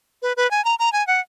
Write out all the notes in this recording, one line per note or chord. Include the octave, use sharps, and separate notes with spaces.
B4
B4
G#5
A#5
A#5
G#5
F#5